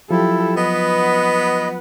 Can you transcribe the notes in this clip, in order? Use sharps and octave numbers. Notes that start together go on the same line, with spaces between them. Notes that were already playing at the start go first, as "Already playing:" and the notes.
F3 F#3 E4 F4 G4 A4
B3 B4 D#5 F#5